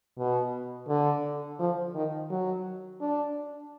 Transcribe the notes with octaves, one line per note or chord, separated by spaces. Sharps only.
B2
D3
F3
D#3
F#3
D4